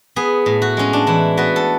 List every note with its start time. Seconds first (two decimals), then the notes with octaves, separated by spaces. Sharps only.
0.16 B3 G#4
0.46 A2
0.62 F#4
0.77 G#3 C#4
0.93 D4
1.07 E3 E4
1.37 B3 F#4
1.56 A4